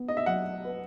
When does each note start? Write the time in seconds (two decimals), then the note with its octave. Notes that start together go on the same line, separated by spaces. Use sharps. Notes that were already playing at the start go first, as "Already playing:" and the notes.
Already playing: B3
0.08 D#5
0.17 E5
0.26 F#3 F#5
0.65 B4